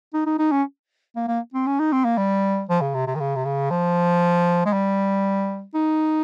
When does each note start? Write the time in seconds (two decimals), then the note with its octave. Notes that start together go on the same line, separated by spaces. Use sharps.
0.14 D#4
0.26 D#4
0.39 D#4
0.52 C#4
1.16 A#3
1.28 A#3
1.54 C4
1.67 C#4
1.80 D#4
1.93 C4
2.05 A#3
2.18 G3
2.69 F3
2.82 C#3
2.95 C3
3.07 C3
3.16 D#3
3.20 C#3
3.36 C3
3.45 C#3
3.71 F3
4.66 G#3
4.73 G3
5.75 D#4